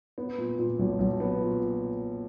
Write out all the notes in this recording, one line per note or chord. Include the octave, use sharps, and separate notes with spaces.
B3
A#2
A#2
B1
B1
B3
A#2